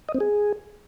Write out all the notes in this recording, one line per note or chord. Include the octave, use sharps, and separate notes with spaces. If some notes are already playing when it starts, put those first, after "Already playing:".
D#5
C4
G#4